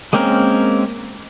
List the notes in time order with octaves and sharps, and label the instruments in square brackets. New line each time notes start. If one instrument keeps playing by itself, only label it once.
[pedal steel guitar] G#3 A#3 C4 C#4 A#4